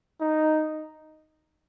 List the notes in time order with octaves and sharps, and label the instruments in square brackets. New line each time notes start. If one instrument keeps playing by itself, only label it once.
[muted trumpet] D#4